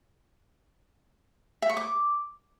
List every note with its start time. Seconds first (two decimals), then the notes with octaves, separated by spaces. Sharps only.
1.62 E5
1.70 C#6
1.77 D6